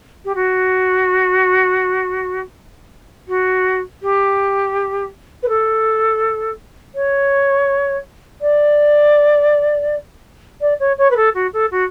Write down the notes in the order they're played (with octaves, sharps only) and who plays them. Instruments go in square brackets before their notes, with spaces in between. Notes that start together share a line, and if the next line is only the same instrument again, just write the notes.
[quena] G4
F#4
F#4
G4
B4
A4
C#5
D5
D5
C#5
C#5
B4
A4
F#4
A4
F#4